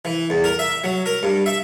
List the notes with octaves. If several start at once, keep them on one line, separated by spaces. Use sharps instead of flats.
E3
E2
A#4
E5
F#3
A#4
G2
E5